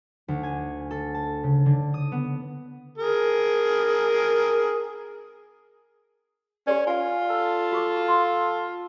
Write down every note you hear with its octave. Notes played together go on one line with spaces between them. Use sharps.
D2
G#5
A4
A5
C#3
D3
D#6
B3
G#4 A#4
C#4 G4 A4 D5
F4 F5 G#5
A4
F#4 C#6 D6
C6